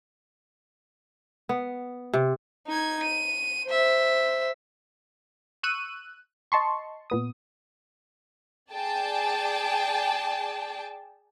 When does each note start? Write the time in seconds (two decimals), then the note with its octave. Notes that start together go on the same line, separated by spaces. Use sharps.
1.49 B3
2.14 C3
2.67 D#4 G#6
3.04 D#7
3.65 C5 E5
5.63 C#6 E6 F#6 D#7
6.52 D#5 A5 C6 C#6
7.10 A#2 B3 D#6
8.73 G#4 D5 G5 A5